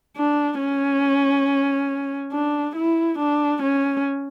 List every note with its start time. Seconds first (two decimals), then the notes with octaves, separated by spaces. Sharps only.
0.16 D4
0.60 C#4
2.32 D4
2.76 E4
3.19 D4
3.63 C#4